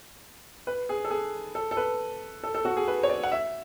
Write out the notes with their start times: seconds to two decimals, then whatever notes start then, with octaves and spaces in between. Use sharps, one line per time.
0.67 B4
0.89 G#4
1.04 A4
1.11 G#4
1.55 A4
1.71 A4
1.77 B4
2.43 A4
2.55 A4
2.65 F#4
2.77 G#4
2.88 B4
3.03 C#5
3.09 D5
3.23 F#5
3.32 E5